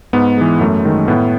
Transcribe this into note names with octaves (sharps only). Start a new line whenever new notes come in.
G#2 B3
E3 G#3
F#2 A3
D#3 G#3
A2 B3